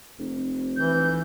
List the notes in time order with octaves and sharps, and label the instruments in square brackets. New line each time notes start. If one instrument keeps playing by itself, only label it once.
[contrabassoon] F1
[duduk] E3 [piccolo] G6